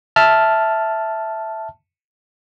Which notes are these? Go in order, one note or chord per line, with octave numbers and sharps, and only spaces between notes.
E5 A5 F6